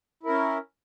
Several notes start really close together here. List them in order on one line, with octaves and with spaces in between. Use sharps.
E4 A#4 C#4